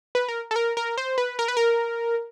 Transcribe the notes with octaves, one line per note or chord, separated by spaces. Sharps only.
B4
A#4
A4
A#4
A#4
C5
B4
A#4
B4
A#4